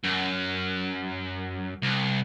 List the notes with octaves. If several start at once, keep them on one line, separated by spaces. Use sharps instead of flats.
F#2
C2